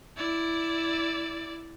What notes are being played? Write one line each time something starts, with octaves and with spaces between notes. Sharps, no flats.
E4 D5